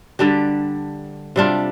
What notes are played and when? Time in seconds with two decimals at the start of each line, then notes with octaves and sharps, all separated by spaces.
0.19 D3 G3 D4 G4
1.36 C3 G3 D4 F4